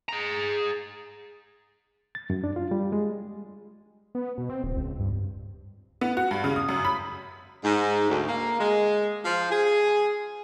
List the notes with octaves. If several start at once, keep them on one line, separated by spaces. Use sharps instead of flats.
G#4 A#5
A6
F#2
D4
F4
G3
G#3
B3
B2
C4
D1
C#2
G2
B3
F#4
G2
C#3
D#6
F#2
B5
G#2
D2
A#3
G#3
F3
G#4